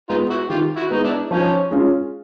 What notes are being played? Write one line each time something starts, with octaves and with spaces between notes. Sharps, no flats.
G#3 B3 D#4 F4
E4 F#4
D#3 F4 G4
E4 F#4
G#3 B3 D#4
D4 E4
F3 C#4 D#4
G#3 C#4 F4